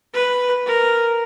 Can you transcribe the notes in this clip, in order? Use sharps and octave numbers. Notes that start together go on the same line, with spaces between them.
B4
A#4